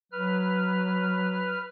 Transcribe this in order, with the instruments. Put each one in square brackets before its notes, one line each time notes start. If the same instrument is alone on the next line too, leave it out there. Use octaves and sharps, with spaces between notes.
[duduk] F#3 [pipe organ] B4 F6